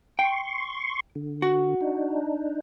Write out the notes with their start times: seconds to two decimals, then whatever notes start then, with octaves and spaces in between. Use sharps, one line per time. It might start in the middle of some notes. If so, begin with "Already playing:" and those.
0.19 G5 C6 C#6
1.15 D3
1.42 F#4
1.81 D4 D#4